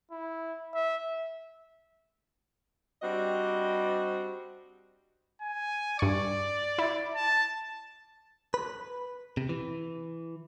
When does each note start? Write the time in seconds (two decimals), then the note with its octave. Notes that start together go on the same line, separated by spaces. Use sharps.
0.11 E4
0.74 E5
3.03 G3 C4 D4 F#4 D#5
5.41 G#5
5.99 G2 D5 C#6
6.78 E4
7.15 A5
8.54 B4
9.37 C3
9.49 E3